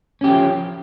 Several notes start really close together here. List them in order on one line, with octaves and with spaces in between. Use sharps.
C#4 G4 F3